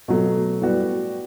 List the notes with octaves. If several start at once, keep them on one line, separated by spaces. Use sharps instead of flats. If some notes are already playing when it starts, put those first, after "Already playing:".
B2 F#3 A3
A2 G3 B3 F#4